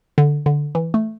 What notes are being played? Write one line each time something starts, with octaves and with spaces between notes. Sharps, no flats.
D3
D3
E3
A3